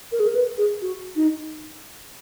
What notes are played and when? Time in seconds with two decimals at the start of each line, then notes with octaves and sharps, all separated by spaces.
0.12 A#4
0.20 G#4
0.27 A#4
0.35 B4
0.58 G#4
0.82 F#4
1.16 D#4